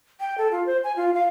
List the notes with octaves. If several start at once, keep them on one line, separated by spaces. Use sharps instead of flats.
G5
A4
F4
C5
G#5
F4
F5